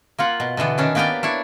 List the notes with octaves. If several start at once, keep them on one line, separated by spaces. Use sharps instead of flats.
A#3 F4 F#5
B2
B2 D3 E3 B3
D#3 C#4 D4
A#3 B3 G4 B4 D5 G5
D4 E4 C#5